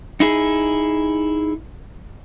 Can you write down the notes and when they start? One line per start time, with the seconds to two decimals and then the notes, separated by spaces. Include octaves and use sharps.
0.20 D#4 E4 G#4